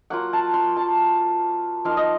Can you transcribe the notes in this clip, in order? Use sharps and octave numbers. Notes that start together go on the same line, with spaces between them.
F#3 A#3 F4 F#5
A5
C6
A5
F3 A#3 D#4 F5
D#5